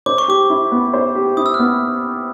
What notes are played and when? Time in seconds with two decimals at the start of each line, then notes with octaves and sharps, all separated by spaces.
0.06 C5 D6
0.18 C#6
0.28 G4 D6
0.50 E4
0.72 B3
0.94 C5
1.15 G4
1.37 E4 D#6
1.46 E6
1.54 F6
1.59 B3